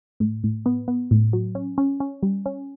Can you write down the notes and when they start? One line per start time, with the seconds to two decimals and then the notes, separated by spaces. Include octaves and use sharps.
0.20 A2
0.44 A2
0.66 B3
0.88 B3
1.11 A2
1.33 F#3
1.55 C#4
1.78 C#4
2.00 C#4
2.23 G3
2.46 C#4